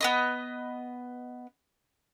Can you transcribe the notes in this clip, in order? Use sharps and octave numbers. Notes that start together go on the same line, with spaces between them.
B3 B4 D#5